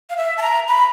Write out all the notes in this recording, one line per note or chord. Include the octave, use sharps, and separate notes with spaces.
F5
E5
A5
A#5
B5